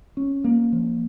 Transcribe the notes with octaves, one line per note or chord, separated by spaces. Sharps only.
C#4
A#3
F3